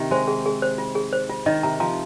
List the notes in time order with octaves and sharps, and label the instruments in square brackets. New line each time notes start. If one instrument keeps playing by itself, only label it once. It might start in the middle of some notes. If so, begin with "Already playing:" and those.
Already playing: [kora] C3 D#3
[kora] G#3 [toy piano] C5
[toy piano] G#4
G#4
C5
F4
G#4
C5
F4
[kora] D#3 [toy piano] D#5
[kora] C3 [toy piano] A#5
[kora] F3 [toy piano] A#5